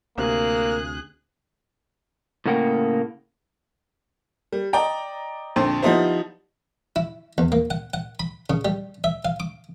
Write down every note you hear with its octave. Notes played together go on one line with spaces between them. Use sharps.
D2 C3 A#3 G#4 F#6
A2 C#3 A#3 F#5 G5
G3
D5 D#5 G5 A#5
A#1 F2 D3 C6
F3 G3 B3 D#4 E4 C5
E4
E2
A#3
F#5
F#5
B5
C#3
G3
E5
F5
D6